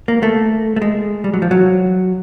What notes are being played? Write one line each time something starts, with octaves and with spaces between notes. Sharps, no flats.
A#3
A3
A3
G#3
G3
F#3
F3
F#3